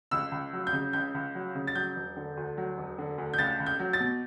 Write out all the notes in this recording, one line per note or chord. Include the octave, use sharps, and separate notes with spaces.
C#2 E6
C#2
F#3
G6
C#3
C#2 G6
C#2
F#3
C#3
A6
F#3 G6
E1
D3
D2
F#3
E1
D3
D2
G6
C#2 A6
C#2
G6
F#3
A6
B2